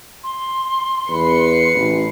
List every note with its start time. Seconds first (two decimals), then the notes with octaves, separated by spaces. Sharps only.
0.24 C6
1.09 E2 B4 C7 C#7
1.75 A1